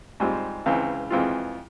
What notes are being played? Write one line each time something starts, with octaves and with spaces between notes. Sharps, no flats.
G#2 G3 C4 F4
C#2 C#3 E3 G#3 C4
F2 E3 G#3 C4 F4